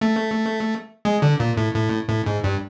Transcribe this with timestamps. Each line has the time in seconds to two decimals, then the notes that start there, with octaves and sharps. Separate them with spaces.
0.01 A3
1.05 G#3
1.22 D3
1.40 A#2
1.57 A2
1.75 A2
2.09 A2
2.26 G#2
2.44 G2